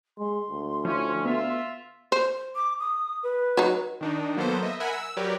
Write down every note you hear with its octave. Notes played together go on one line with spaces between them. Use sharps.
G#3 C6
D2
F3 C#4 E4
B3 F4 E5
C5
D6
D#6
B4
F#3 D#4
D#3 D4 D#4
F#3 A#3 B3 A4 C5
D#5 E5
A#4 E5 F#5 G#5 B5
E6
F#3 G4 A#4 B4 C#5 D5